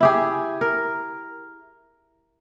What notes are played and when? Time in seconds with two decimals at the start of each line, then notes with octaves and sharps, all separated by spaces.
0.01 E4 G4 G#4
0.61 A#4